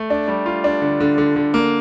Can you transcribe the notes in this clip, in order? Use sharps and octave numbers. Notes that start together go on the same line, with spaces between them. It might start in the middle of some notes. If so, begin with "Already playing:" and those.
Already playing: A3
D4
G3
F4
D4
D3
D3
D3
D3
A#3